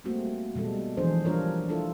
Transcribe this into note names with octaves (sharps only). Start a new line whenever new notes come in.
G3 A3 A#3 C4 F#4
B2 G3 G#3 A4
E3 F3 D4 G#4 C5
G3 D4 F4 A#4 C#5
D4 E4 F4 A4